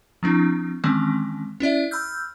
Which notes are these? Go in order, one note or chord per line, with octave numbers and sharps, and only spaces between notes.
F3 C4 D4 E4
D#3 E3 G#3 C4 C#4
C#4 E4 D5 E5
B5 E6 F6 G6